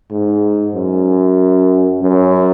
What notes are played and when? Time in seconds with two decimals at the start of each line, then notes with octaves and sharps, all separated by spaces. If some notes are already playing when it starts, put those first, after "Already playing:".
0.11 G#2
0.75 F#2
2.02 F#2